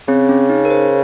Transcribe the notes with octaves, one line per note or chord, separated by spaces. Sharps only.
C#3 C4
C#4
D#4
A#4
C5